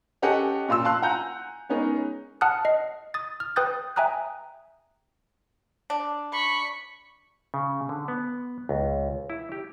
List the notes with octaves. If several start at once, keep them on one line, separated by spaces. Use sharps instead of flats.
C#4 G4 A4 D#5 F#5 G#5
A#2 F4 C6 E6
F5 A5 C6 F#6
F#5 G#5 A#5 G6
G#3 B3 C#4 D#4 G#4 A#4
F#5 A5 D#6 F6 F#6
D#5 C7
D#6 A6
F6
B4 G5 D#6 F#6 G6 A6
E5 G5 G#5 A#5 D#6 F#6
D4
B5 C#6 B6
C#3
D3
B3
C#2
E4
G4